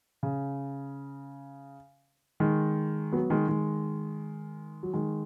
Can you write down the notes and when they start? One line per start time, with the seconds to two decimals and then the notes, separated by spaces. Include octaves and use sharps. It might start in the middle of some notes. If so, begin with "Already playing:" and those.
0.23 C#3
2.40 D#3 G#3
3.12 F#3 B3
3.30 D#3 G#3
3.48 D#3 G#3
4.83 F#3
4.93 D#3 G#3